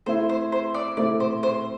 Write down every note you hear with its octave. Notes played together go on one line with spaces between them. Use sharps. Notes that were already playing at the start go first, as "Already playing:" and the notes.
A3 C4 E4 C5
C5
C5
D5
A3 C4 E4 D5
C5
C5